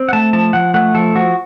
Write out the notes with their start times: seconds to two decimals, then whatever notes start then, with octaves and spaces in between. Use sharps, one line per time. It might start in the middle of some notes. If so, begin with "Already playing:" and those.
Already playing: C4
0.09 F#5
0.13 A3 A5
0.33 F3 A5
0.53 F3 F#5
0.74 A3 F#5
0.94 F3 A4
1.15 F3 F#4